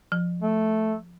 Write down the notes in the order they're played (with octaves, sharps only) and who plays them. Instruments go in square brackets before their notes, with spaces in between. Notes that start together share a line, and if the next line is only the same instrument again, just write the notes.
[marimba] F3
[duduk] A3